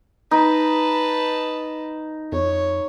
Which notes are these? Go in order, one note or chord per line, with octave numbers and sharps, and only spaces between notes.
D#4 B4 A5
F2 C#5